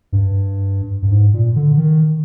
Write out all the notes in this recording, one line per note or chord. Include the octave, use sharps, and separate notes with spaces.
G2
G2
G#2
A#2
D3
D#3